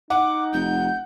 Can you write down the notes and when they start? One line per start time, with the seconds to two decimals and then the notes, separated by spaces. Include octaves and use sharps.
0.10 D#4 F#5 D6
0.53 F1 G6